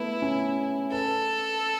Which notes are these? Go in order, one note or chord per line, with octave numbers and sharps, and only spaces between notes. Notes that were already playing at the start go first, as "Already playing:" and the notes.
Already playing: A3 B3 E4
C#4
A4 B4